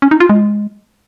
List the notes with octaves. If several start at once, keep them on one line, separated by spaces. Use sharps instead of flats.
C#4
D#4
F4
G#3